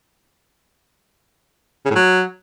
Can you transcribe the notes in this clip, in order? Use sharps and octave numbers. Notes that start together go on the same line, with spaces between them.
C#3
A2
F#3